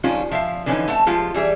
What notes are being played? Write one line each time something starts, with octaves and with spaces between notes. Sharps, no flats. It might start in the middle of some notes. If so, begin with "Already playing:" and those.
D#3 F3 G3 G#3 C#4 F4
F3 E5 F5
D3 E3 F3 C#4 D#4
A3 F#5 A5
F3 G#3 F4 G4
E3 G3 G#4 E5